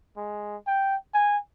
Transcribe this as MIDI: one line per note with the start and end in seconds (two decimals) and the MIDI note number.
0.17 0.57 56
0.67 0.96 79
1.14 1.38 80